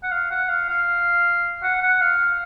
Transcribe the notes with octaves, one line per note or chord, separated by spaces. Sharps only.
F#5
F5
F#5
F5
F5
F#5
F#5
F5